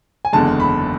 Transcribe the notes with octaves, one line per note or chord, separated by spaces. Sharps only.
G#5
F#1 E2 D3 G#3 A5
B5